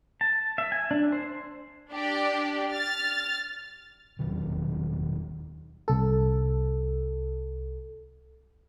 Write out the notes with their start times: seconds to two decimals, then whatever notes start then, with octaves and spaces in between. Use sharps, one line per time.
0.21 A5
0.58 E5
0.72 G#5
0.91 D4
1.12 C5
1.92 D4 G4 D5
2.72 F6 A6
4.19 E1 D#2 D#3 F#3
5.88 C2 A4